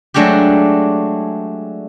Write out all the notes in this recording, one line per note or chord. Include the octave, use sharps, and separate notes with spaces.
F#3 G#3 A3 D4 F#4 G4